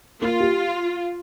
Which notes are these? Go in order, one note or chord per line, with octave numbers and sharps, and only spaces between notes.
A#3 F4
G4